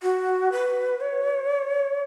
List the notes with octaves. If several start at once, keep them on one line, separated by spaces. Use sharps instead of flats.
F#4
B4
C#5